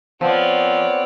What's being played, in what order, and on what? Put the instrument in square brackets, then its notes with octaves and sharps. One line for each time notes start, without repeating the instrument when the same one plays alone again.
[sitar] F3 [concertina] B3 C4 [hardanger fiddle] C#5 D5